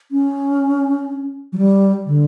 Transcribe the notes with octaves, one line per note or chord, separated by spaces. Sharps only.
C#4
F#3
G3
D3